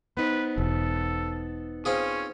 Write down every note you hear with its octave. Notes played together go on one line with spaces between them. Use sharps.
B3 D#4 B4 C5
E1 A4
C4 C#4 F4 G#4